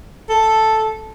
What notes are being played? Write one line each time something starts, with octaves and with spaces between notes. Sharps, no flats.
A4